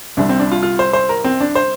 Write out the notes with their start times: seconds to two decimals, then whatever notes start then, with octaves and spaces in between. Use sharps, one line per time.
0.17 C2 C3 G3 D4
0.29 C4
0.40 D4
0.52 F4
0.63 F4
0.79 C5
0.93 C5
1.09 A#4
1.24 C4
1.40 D4
1.55 C5